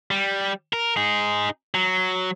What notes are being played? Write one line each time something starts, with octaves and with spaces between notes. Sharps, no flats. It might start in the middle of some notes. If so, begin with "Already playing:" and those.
G3
A#4
D#4 G#4
F#3